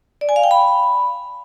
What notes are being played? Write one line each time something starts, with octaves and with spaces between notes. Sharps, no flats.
D5
G#5
F5
G5
B5